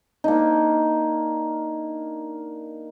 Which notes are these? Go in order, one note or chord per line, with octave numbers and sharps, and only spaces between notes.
A#3 D4 D#4